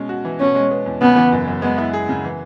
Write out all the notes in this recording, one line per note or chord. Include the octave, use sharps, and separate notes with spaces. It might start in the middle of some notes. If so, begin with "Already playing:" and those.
Already playing: B2 G#3 C#4
F#4
E3
B2 C#4
G#3
B3
E2
C#3 B3
E3
F#2
F#2
G#3 B3
E4
G#4
C#3
E3